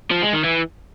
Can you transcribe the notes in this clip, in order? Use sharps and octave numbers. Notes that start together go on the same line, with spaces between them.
F3
G#3
D#3
E3